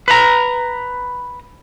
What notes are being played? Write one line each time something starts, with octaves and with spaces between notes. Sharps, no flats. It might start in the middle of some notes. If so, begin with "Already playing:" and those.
B4 A#5